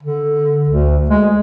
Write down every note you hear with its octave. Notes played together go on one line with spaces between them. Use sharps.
D3
D2
G#3